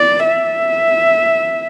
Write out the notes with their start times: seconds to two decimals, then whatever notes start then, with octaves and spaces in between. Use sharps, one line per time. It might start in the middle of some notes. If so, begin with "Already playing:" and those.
Already playing: D5
0.28 E5